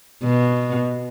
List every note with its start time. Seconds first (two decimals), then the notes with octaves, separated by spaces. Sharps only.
0.23 B2